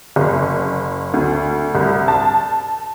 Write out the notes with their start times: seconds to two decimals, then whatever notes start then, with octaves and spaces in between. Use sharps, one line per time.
0.16 F#1
1.14 D2
1.75 C2
2.08 A5